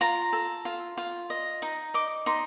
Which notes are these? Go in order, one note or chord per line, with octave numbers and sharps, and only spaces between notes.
F4 A#5
A4
F4
F4
D#5
D#4
D#5 D6
D#4 C6